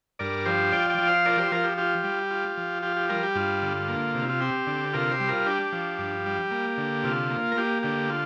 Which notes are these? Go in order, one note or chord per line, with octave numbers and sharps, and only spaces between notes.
G2 A#4 D5
F3 G4 C5
F4 D5 G5
D5 G5
F3
C5 F5
F4 A#4 D5
G4 C5
F3 F4 A#4
G4
F4 G4
G3
F4
F3
F4 G4
G4
G3 F4 A#4
G4
G2 F4
D3
A#3
C3
F4
C4 G4
D3
C3 F4 A#4
G4 C5
G3
F4 A#4
D4 G4
F3
G2
G3
A#3
D3
C3 F4
A#3
A#4
A#3 G4
D3 G4
F4